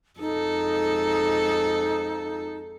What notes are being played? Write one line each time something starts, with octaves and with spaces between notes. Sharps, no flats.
F2 G#3 D#4 A4